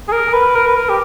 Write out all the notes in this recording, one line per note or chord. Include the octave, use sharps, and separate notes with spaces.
G#4
A#4
B4
A#4
B4
A#4
G4